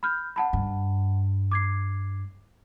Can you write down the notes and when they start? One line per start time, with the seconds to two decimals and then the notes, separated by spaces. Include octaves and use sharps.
0.03 B5 F6 G6
0.36 F#5 A5 B5
0.53 G2
1.52 D6 G#6 C7